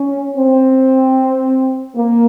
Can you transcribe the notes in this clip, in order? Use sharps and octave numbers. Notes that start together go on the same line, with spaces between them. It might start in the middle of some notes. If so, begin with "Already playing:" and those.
Already playing: C#4
C4
A#3